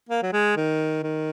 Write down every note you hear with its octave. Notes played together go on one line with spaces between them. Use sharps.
A#3
F#3
G#3
D#3
D#3